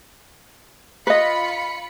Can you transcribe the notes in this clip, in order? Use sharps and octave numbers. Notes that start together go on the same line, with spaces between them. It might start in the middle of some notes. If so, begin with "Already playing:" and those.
F4 B4 D#5 B5 C#7